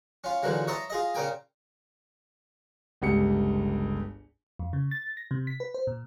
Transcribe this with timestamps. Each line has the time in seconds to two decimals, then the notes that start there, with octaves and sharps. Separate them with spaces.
0.24 C#4 F4
0.43 A#2 D3 E3 F#3 G#3
0.68 C#5 D#5 E5 A5 A#5 C6
0.90 F4 G#4 D#5
1.14 A#2 C#3 A#4 G5 G#5
3.02 G1 C#2 G4 C#7
4.59 F2
4.73 C#3
4.91 A6
5.17 A#6
5.31 C3
5.47 B6
5.60 B4
5.74 C5
5.87 A#2